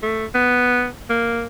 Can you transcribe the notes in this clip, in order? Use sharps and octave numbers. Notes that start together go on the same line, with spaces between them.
A3
B3
A#3